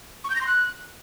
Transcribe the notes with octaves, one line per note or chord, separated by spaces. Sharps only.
C#6
G6
A#6
C6
F#6